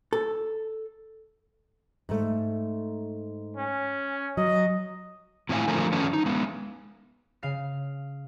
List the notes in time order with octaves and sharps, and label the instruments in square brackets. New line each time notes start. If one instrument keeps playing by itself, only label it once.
[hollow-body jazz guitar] A4
[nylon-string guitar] G#2 A3
[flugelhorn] C#4
[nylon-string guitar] F#3 [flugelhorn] D#5
[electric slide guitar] A2 C4 E4 C#5 F5 G#5
D3 F3 A3 C4 F4 A#4
D#3 F#3 C#4 A4 B4
D#4
G#3 B3
[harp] C#3 F5 C7